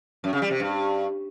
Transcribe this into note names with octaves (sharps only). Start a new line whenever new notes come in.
F#2
C#3
G3
C3
G2